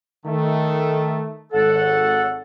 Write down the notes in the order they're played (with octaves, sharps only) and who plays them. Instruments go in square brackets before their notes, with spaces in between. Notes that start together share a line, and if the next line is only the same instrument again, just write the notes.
[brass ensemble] D#3 A3
[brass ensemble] G#1 C#5 F#5 [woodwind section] A4